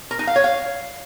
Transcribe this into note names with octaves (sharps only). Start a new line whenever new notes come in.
A#4
D#4
F5
C#5
F5